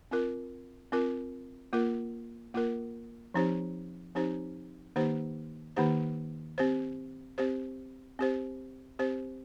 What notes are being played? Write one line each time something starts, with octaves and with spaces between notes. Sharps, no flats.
C4 F4 A#4
C4 F4 A#4
A#3 F4 A#4
A#3 F4 A#4
F3 C4 D#4 G4 C5
F3 C4 D#4 G4 C5
D#3 A#3 D#4 G4 C5
D#3 A#3 D#4 G4 C5
C4 G4 C5
C4 G4 C5
C4 G4 C5
C4 G4 C5